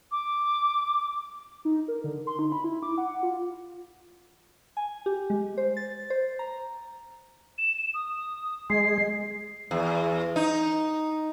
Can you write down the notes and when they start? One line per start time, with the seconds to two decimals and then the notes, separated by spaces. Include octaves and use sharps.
0.11 D6
1.65 D#4
1.88 A#4
2.04 D3
2.27 C6
2.39 D#4
2.52 B5
2.64 E4
2.83 D6
2.98 F#5
3.23 F4
4.77 G#5
5.06 G4
5.30 G#3
5.57 C5
5.77 A6
6.10 C5
6.39 A#5
7.58 E7
7.94 D#6
8.70 G#3 C7
9.71 E2
10.36 D#4